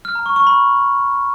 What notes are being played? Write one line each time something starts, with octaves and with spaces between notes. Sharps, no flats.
F6
A#5
C#6
C#6
B5